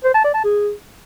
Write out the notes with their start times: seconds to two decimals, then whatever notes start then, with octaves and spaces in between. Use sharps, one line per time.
0.04 C5
0.14 A5
0.24 D5
0.34 A5
0.44 G#4